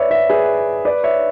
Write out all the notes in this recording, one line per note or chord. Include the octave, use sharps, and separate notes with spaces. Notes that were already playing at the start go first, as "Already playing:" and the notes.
Already playing: B4 C#5 D5 E5
C#5 E5
G#4 B4
B4 D5
C#5 E5